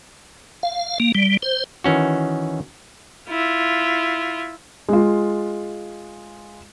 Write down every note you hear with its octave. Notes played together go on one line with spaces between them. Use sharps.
F5
A#3
G3
C5
D#3 E3 C#4 F#4
E4 F4
G#3 F4